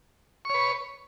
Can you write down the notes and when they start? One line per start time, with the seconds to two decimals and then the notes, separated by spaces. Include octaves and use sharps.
0.45 C#6
0.50 C#5
0.54 B4